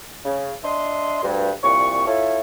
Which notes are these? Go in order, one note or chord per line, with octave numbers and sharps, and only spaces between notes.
C#3
D4 D#5 E5 C6
D2 G2
C2 A#2 C#6
E4 F4 A4 C#5 E5